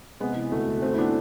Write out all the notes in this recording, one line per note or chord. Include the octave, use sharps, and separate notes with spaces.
C3 G#3 B3
E3
D2 A3
D2
G#2 A3 C4
E4
E3 B3 D4